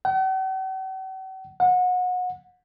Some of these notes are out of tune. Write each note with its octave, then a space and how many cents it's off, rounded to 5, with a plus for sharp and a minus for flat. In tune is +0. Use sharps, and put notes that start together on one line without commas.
F#5 +45
F#5 -30